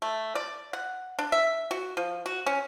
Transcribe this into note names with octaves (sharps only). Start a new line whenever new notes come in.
A3
D5
F#5
D4
E5
F#4
F3
F#4
C#4